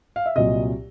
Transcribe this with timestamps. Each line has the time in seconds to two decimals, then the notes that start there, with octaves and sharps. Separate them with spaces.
0.16 F5
0.26 E5
0.36 C2 A#2 F#3 D#5